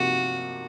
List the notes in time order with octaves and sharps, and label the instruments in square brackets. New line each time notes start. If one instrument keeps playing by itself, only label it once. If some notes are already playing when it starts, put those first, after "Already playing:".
Already playing: [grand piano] C3 F3 A#3 D#4 [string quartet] F#4